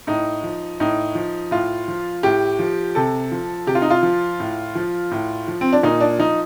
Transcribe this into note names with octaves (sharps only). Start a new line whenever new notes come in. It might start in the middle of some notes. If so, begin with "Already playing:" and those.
A2 D#4
F3
A2 D#4
F3
A2 F4
F3
A2 G4
F3
C3 A4
F3
C3 G4
F4
D#4
F4
F3
A2
F3
A2
F3
C4
D4
A#2 D#4
D4
F3 D#4